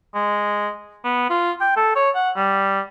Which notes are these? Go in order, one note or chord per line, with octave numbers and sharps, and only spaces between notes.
G#3
B3
F4
G5
A4
C#5
F#5
G3